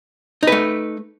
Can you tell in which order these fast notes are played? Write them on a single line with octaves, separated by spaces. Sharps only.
D#4 B4 A3